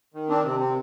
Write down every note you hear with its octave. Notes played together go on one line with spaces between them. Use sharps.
D#3
C4 D4
C3 C4
C4